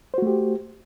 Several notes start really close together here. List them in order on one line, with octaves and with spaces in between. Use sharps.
C5 F#4 A3 G4